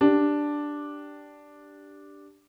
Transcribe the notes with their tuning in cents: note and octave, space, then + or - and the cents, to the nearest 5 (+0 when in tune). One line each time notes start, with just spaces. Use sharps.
D4 +0 G4 +0